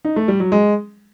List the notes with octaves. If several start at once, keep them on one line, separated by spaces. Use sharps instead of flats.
D#4
A3
G3
F#3
G#3